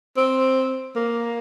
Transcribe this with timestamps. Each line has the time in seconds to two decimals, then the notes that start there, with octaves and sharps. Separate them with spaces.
0.17 C4
0.96 A#3